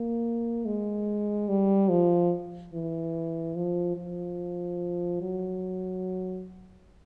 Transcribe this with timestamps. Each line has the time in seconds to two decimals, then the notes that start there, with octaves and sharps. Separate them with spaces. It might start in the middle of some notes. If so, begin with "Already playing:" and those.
Already playing: A#3
0.66 G#3
1.48 G3
1.90 F3
2.73 E3
3.55 F3
3.96 F3
5.21 F#3